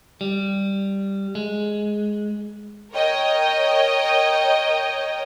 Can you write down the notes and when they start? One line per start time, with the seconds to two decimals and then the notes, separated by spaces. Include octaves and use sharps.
0.21 G3
1.35 G#3
2.92 A#4 C#5 D#5 G5